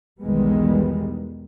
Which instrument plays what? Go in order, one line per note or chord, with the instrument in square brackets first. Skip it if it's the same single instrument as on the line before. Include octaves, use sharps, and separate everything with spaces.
[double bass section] B1 E2 D#3 G3 G#3 B3